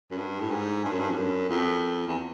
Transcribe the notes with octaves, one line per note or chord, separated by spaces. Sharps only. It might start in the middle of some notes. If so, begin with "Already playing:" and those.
F#2
G2
A2
G#2
G2
F#2
G2
F2
F#2
F2
E2